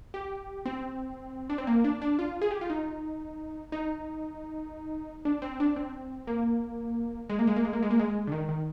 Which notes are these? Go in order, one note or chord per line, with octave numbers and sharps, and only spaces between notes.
G4
C4
D4
C4
A#3
D4
D4
F4
G#4
G4
F4
D#4
D#4
D4
C4
D4
C4
A#3
G#3
A#3
G#3
A#3
G#3
A#3
G#3
A#3
G#3
D3
D#3
D#3